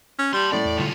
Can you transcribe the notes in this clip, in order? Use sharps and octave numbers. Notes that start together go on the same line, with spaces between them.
C#4
G3 A5 C6
A2 G3 A#3 C#4 D5
E2
B1 D3 G3 F4